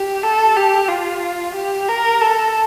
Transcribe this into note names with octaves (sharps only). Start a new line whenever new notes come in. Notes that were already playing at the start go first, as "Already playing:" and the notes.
Already playing: G4
A4
G4
F4
G4
A#4
A4